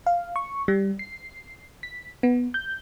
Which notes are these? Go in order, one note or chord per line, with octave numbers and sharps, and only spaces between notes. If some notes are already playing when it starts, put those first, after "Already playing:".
F5
C#6
G3
C7
B6
B3
G6